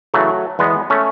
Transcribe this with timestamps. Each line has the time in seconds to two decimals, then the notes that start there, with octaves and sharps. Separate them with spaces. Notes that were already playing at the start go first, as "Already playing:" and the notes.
0.14 C#3 E3 F#3 A3
0.59 E2 G#3 B3
0.90 A3 C#4